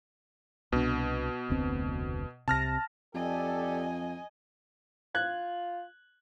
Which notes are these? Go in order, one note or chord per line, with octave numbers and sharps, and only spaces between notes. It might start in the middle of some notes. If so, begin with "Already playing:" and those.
C2 B2 D4
F1 D2 C4
C2 C3 A5 F6 A#6
F2 G4 A4 D5 D#5 G#5
F4 F#6 G#6